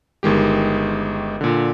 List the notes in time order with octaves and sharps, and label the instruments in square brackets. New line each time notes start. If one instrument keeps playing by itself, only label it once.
[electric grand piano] G1 D#3 G#3 G4
A#2 D3